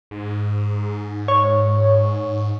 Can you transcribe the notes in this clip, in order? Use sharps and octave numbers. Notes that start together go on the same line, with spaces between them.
G#2
C#5